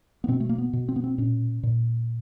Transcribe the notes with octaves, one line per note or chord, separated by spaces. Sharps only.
B3
B2 C4
A3
A#3
B3
B2
C4
B3
C4
A#2 C#4
A#2